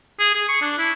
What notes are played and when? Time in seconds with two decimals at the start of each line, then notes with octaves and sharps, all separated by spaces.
0.20 G#4
0.35 G#4
0.48 C#6
0.61 D4
0.78 E4